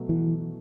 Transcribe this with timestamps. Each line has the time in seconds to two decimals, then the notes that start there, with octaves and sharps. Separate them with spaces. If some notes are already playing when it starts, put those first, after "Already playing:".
Already playing: B2 F#3 A3
0.09 E3